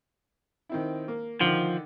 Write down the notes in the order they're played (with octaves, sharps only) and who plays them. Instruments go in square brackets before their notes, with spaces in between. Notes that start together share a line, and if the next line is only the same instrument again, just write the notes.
[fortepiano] D#3 C4 E4
A#3
[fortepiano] D3 D#3 [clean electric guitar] F3